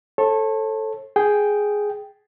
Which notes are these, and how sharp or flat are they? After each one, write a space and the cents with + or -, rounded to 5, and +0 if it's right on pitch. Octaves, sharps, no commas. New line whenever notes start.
A4 +0 C#5 -40
G#4 +0 G5 +0